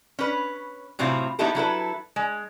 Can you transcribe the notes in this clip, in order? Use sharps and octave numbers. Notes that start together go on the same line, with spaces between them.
C#4 B4
A2 C3 F#3 C4 E4 F4
F#3 B3 D#4 E4 G4 A4
F#3 E4 A4 B4
G#3